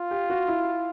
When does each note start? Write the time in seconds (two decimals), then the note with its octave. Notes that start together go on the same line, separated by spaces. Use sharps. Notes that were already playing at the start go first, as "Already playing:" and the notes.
Already playing: F4
0.11 G4
0.30 F#4
0.48 E4